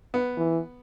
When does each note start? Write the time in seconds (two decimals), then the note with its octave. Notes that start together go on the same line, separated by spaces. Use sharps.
0.14 B3
0.37 E3